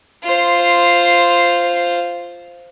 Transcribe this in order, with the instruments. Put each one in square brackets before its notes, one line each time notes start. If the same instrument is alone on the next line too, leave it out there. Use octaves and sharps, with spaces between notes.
[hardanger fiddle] F4 C5